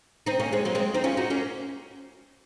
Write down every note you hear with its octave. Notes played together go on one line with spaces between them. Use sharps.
C4 D#4
A#3 C#4
G#3 C4
F#3 A#3
G#3 C4
C4 D#4
C#4 F4
D#4 F#4
A#3 C#4